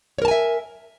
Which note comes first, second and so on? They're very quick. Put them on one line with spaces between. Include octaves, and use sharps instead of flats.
C#5 A#4 A5 G#5 E5